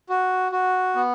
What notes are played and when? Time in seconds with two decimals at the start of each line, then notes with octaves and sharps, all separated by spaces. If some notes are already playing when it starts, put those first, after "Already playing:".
0.09 F#4
0.52 F#4
0.95 B3